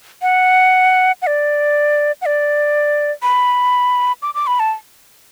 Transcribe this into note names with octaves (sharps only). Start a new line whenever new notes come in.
F#5
F#5
D5
F#5
D5
B5
D6
D6
B5
A5